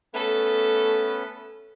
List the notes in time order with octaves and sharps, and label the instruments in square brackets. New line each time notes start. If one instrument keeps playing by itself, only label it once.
[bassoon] A3 [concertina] B3 C#4 B4 [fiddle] A4